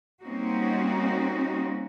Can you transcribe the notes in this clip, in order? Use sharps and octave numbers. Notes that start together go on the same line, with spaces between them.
G3 A#3 C4 C#4 D#4 F#4